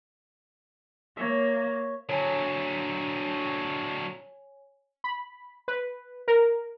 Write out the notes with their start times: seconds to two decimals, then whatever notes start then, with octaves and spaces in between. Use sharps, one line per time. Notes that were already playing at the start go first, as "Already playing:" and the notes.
1.17 A#3 C#5 E5
2.09 D3 F#3 C#5 G#5
5.04 B5
5.68 B4
6.28 A#4